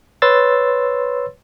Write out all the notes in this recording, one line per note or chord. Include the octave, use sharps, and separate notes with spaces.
B4 C#5 C6 E6 A6